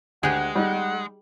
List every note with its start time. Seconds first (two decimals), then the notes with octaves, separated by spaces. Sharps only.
0.23 D2 G#3 G4 G#4 F#5
0.55 G3 D#4 F#5